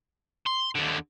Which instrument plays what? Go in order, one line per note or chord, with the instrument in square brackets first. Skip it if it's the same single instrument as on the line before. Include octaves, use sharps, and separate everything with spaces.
[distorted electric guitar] C6
D#2 D3